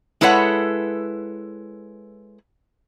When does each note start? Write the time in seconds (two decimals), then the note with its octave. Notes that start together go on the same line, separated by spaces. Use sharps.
0.21 G#3 E4 A4 B4 C#5 F#5